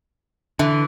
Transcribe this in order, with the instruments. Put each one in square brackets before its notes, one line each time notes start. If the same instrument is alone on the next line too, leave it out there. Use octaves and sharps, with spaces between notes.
[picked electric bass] D3 [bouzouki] E3